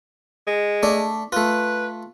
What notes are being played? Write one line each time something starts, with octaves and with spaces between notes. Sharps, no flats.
G#3
A3 D4 D5
A3 F4 B4